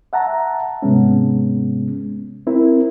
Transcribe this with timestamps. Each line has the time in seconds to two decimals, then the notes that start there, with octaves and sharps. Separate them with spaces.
0.13 E5 F#5 A5 A#5
0.82 G#2 C3 G#3 B3 C#4
2.47 C4 E4 A#4